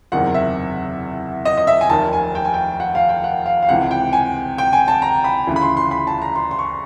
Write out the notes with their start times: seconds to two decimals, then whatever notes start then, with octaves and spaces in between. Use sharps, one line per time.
0.12 F#1 E2 C3 D#3 F#5
0.34 E5
1.45 D#5
1.57 D#5
1.67 E5
1.81 G#5
1.90 F1 D#2 D#3 A5
2.13 G#5
2.35 G5
2.45 G#5
2.54 G5
2.80 F#5
2.95 F5
3.09 G5
3.24 F#5
3.46 F5
3.62 F5
3.69 C#2 C3 E3 F#5
3.91 G5
4.13 G#5
4.58 G5
4.73 G#5
4.88 A5
5.02 A#5
5.24 B5
5.47 D2 C#3 E3
5.56 B5
5.62 C6
5.77 C6
5.91 B5
6.07 A5
6.22 A#5
6.36 C6
6.51 C6
6.59 C#6